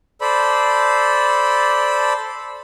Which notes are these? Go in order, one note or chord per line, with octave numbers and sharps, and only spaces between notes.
A4 C5 D5 B5